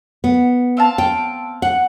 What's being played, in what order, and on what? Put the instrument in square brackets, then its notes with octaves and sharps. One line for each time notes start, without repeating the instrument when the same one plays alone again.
[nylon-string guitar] B3
[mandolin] C4 F5 A5
[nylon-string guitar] G5
F#5